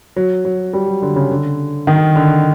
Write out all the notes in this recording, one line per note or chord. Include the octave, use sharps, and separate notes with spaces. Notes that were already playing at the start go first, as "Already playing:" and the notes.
F#3
F#3
G3
F#3
D3
C#3
D3
D#3
D3